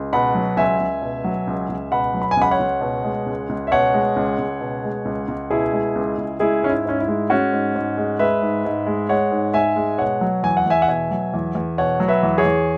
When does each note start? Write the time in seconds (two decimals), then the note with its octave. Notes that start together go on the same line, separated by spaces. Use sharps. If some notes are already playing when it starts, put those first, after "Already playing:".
Already playing: C#2
0.13 B2 F#5 B5
0.35 F#3
0.57 C#2 E5 G#5
0.81 C#2
1.02 B2
1.24 F#3
1.47 C#2
1.69 C#2
1.92 B2 F#5 B5
2.14 F#3
2.22 B5
2.31 G#5
2.37 C#2 F#5 B5
2.51 C#5 F#5
2.60 C#2
2.81 B2
3.04 G#3
3.26 C#2
3.49 C#2
3.67 E5
3.71 B2 C#5 F#5
3.94 G#3
4.16 C#2
4.39 C#2
4.61 B2
4.84 G#3
5.05 C#2
5.28 C#2
5.50 B2 E4 G#4
5.73 G#3
5.95 C#2
6.18 C#2
6.40 G#3 E4 G#4
6.63 G#2 C#4
6.70 E4
6.85 G#2 C#4
7.00 E4
7.08 G#3
7.30 G#3 C#4 F#4
7.53 G#2
7.75 G#2
7.98 G#3
8.19 G#3 B4 E5
8.42 G#2
8.65 G#2
8.87 G#3
9.09 G#3 C#5 F#5
9.31 G#2
9.54 G#2 E5 G#5
9.76 G#3
9.98 B2 C#5 F#5
10.21 F#3
10.43 E2 G#5
10.57 F#5
10.66 E2 E5 G#5
10.82 F#5
10.88 B2 E5 G#5
11.11 F#3
11.34 E2
11.55 E2
11.78 B2 C#5 F#5
12.00 F#3
12.08 B4 E5
12.23 E2
12.38 G#4 C#5
12.45 E2